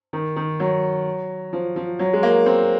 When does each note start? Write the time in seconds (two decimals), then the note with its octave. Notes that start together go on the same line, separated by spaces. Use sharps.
0.13 D#3
0.36 D#3
0.60 F#3
1.53 F3
1.76 F3
1.99 F#3
2.13 G#3
2.23 A#3
2.46 C4